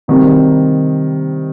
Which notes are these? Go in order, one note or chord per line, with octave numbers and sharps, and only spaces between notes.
C3 D#3 G3 C4